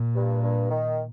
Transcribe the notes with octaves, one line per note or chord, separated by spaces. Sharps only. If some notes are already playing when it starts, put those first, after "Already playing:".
Already playing: A#2
G2
G2
D#3